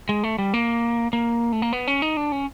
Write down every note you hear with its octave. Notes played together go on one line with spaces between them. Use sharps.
G#3
A3
G3
A#3
A#3
A3
A#3
B3
C#4
D#4
D4
C#4